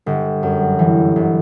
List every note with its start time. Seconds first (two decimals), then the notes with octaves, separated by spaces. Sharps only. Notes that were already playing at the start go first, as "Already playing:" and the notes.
0.06 G1
0.43 F#2
0.79 E3
1.16 G1